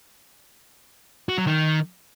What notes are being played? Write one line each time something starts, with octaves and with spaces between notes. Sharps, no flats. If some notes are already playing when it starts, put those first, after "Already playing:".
F#4
F#3
D#3